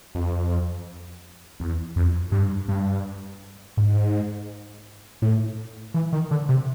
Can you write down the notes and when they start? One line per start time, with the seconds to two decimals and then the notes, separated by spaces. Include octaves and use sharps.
0.15 F2
1.60 E2
1.96 F2
2.32 G2
2.68 G2
3.77 G#2
5.22 A2
5.94 E3
6.13 D#3
6.31 D3
6.49 C3